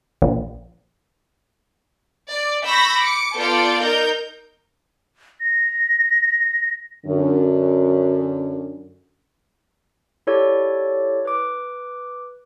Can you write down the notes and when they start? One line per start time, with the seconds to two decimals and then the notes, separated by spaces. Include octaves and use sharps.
0.22 A#1
2.31 D5
2.66 B5 C#6 E6 G6 A#6 B6
2.98 D6 C#7
3.36 B3 F4 A4 D5 G6 D7
3.82 D#4 A#4 G6
5.40 A#6
7.06 F#2 D3
10.27 E4 G4 A4 C#5 D5
11.25 B4 D6